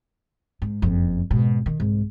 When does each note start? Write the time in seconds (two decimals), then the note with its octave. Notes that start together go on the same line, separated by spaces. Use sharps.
0.62 G#2
0.82 F#1 F2
1.31 G#2 B2
1.66 D#3
1.80 C2 G#2